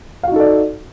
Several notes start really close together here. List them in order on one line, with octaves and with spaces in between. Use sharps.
F5 F#4 D#4 A4 D5